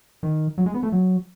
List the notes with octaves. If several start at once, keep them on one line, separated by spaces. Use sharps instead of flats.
D#3
F#3
G#3
B3
A3
F#3